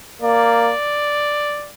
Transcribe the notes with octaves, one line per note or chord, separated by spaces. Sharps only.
A#3 D5